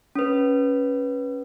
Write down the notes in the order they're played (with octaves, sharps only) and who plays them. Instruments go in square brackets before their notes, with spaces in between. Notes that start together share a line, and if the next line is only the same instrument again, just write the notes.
[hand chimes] C#4 B4